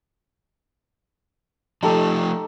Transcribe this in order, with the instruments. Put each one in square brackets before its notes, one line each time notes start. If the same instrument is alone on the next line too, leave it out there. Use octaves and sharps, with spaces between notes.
[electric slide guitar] F3 A3 [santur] D#4 G4 A4